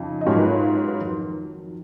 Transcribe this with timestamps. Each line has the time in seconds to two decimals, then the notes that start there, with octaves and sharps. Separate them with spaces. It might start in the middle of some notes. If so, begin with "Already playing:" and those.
Already playing: F2 C#3 F3 D#4
0.21 D#5
0.26 G#2 F#3 C#4 F4 C#5
0.35 A#4
0.39 B4
0.51 C#5
0.63 F5
0.75 C#5
0.87 B4
1.00 F2 D#3 F#3